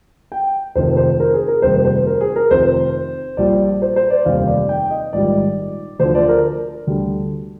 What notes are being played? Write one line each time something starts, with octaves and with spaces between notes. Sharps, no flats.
G5
F1 F2 D#3 C5
C5
A#4
G#4
A#4
F1 D#2 D#3 G3 C5
C5
A#4
G#4
A#4
F1 F2 C3 D#3 C5
A#1 A#2 G3 D5
C5
C5
D5
F1 D#2 D#3 G3 F5
D5
G5
D#5
A#1 G#2 D#3 G3 D5
D2 D3 F3 C5
D5
A#4
D2 D3 G3